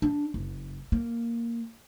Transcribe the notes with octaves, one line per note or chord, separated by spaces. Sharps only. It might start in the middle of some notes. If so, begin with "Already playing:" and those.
D4
F#1
A#3